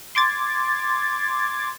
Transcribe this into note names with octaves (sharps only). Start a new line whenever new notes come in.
C6 D6 G#6 A6